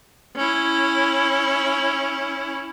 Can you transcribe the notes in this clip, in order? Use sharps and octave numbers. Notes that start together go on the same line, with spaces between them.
C#4 E4